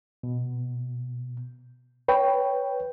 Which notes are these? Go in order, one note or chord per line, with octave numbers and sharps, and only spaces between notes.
B2
B4 C#5 G5